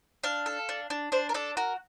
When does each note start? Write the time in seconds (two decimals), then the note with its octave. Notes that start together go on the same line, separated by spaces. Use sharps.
0.24 D4 F5
0.46 A4
0.69 D4
0.90 D4
1.12 D4 C5
1.29 A#4
1.34 D4 A4
1.57 F#4 A#4